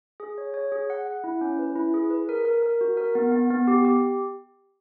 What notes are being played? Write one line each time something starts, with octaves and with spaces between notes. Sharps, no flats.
G#4
C#5
C#5
G#4
F#5
F#5
E4
C#4
B4
E4
G#4
B4
A#4
A#4
A#4
F#4
A#4
B3
B3
B3
G4
G4